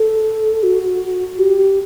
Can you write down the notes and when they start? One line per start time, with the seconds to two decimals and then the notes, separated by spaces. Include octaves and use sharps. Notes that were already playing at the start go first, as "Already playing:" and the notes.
Already playing: A4
0.63 F#4
1.39 G4